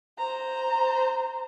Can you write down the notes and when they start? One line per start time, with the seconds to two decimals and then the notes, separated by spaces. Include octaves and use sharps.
0.19 C5 A#5